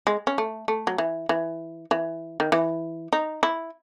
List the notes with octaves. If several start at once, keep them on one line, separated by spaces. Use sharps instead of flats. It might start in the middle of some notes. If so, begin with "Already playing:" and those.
G#3
C#4
A3
A3
F#3
E3
E3
E3
D#3
E3
D#4
E4